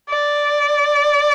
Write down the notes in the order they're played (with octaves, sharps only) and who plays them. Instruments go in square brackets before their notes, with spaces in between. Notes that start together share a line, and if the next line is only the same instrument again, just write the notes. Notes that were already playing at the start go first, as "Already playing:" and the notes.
[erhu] D5